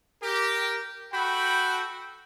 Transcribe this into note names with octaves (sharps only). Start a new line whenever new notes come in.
G4 A#4
F#4 A4 G5 B5